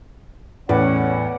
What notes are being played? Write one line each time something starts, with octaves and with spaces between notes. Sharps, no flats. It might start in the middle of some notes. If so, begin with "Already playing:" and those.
E2 A2 C#4 B4 D5 F#5